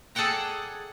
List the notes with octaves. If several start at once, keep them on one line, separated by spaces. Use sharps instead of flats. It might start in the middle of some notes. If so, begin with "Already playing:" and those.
G#4 A4 D5 F#5 G5 A#5